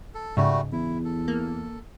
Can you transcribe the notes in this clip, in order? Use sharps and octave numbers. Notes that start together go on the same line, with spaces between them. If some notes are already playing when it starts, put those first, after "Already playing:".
A4
G#2 C#3 G3 A3 F#4
E2 E4
A4
A#3